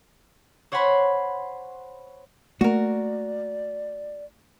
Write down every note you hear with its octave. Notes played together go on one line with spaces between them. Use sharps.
C5 C#5 F#5 G#5 B5 C6
A3 A#3 F#4 A#4 D5